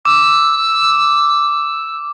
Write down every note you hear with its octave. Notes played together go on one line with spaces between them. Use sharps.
D6 E6